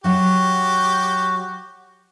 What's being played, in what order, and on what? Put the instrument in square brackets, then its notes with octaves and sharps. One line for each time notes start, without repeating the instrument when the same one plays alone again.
[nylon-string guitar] F#3 E5 [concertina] F#4 [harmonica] G4